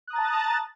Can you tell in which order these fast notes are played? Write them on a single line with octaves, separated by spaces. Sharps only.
F#6 D#6 A#5 A6 A5